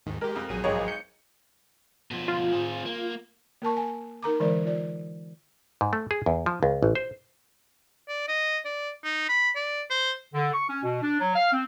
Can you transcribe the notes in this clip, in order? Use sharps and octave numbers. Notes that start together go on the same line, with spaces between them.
D#2 G#2 D#3
G#3 G4 A#4
F2
A#1 F#3 G#4 D#7
G#1 F2 G#3 C#5
G6 C#7
B2 F3
F4
C4 G#4
A#3
A#3 A#4 A5 C#6
G#5
D#4 A#4 A#5 D6
D3 E3 G#3 A#4 C5 D5
F4 D5
G#2
A3
G#4
E2
F3
C#2
A1
C5
D5
D#5
D5
D#4
B5
D5
C5
D3
C#6
C#4
B2
D4
F#3
F5
C4